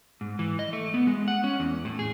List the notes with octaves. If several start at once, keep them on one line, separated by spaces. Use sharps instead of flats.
G#2
E3
D#5
A3
B3
G#3
F#5
C#4
E2
A2
G#4